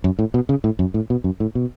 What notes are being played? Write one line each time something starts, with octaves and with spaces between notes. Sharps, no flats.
F#2
A2
B2
C#3
A2
F#2
A2
B2
F#2
A2
B2